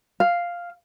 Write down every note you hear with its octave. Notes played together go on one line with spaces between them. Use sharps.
F5